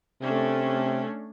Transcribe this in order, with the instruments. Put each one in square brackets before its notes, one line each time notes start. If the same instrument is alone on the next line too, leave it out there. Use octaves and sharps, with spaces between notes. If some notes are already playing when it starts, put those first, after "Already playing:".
[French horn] C3 [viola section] A3 C#4 D4